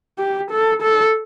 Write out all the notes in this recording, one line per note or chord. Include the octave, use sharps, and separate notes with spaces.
G4
A4
A4